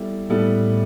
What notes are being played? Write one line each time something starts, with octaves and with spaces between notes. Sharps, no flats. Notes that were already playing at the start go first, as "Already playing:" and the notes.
Already playing: G3 B3 E4 A4
A2 G3 B3 E4 A4